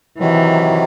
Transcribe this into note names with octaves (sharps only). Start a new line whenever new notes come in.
C3 D#3 E3 F#3